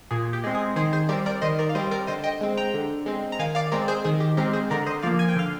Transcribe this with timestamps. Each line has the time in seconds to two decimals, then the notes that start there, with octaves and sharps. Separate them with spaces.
0.11 A#2 G#4
0.33 G4
0.44 G#3 C4
0.55 G#4
0.76 D#3 G#4 C5
0.93 G#4 C5
1.09 G3 C4 A#4 D5
1.26 A#4 D5
1.42 D#3 C5 D#5
1.59 A#4 D5
1.69 F5
1.75 G3 C4 C5 D#5
1.91 A#4 D5
2.07 D3 C5 D#5
2.24 D#5 G5
2.41 G#3 C4
2.57 G5 A#5
2.74 D3
3.06 G#3 C4
3.32 A#5
3.39 D#3 F5 G#5
3.55 D5 F5
3.72 G#3 C4 A#4 D5
3.88 G#4 C5
4.05 D#3 G#4
4.20 G4
4.37 G#3 C4 G4 A#4
4.53 G#4 C5
4.70 D3 A#4 D5
4.86 C5 D#5
5.02 F3 A#3 D5 F5
5.19 G#5
5.29 G5
5.36 D3 F5